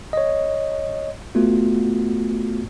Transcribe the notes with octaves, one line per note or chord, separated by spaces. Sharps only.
C#5 D#5
A3 B3 F4 F#4